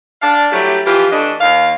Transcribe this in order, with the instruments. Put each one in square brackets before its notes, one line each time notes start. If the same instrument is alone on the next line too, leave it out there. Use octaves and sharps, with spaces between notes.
[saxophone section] D4 F5
F#3 G3 A3 E4 G4
E3 F3 F4 G4
E3 A3 D4 D#5
D#2 F5